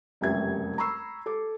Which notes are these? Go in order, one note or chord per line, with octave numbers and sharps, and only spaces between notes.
F1 C#2 F#2 G3 E5 G#6
A#5 B5 C#6 E6 C7
A4 D6